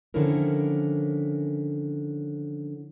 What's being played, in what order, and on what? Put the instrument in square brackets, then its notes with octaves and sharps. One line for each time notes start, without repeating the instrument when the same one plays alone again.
[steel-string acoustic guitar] D3 D#3 F3 C#4 E4 A#4